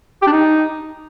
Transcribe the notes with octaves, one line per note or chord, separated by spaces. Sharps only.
G4
D4
D#4